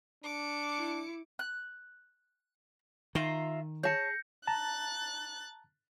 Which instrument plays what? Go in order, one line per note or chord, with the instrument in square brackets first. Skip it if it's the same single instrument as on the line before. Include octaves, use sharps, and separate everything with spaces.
[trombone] D4 [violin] D6 C#7
[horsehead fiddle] E4
[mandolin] F#6
[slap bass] D#3 [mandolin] F4 E5 A#5
[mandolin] G#4 [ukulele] C#5 A5 [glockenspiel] G6 A#6 C#7
[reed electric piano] A5 A#5 [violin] F#6 A6